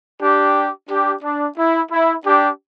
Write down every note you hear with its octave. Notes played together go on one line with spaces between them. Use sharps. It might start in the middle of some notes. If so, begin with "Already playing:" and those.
D4 G4
D4 G4
D4
E4
E4
D4 G4